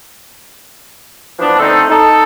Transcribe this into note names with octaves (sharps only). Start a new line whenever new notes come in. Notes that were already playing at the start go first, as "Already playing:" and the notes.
E3 F3 B3 D4
D3 A3 C4 D#4 A4
D#4 A4